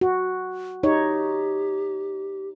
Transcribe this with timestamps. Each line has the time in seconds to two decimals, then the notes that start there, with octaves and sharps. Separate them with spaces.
0.01 F#4
0.83 D#4 G4 C#5